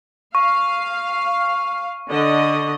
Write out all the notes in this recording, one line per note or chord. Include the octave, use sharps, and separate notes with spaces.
F5 C#6
D3 D#5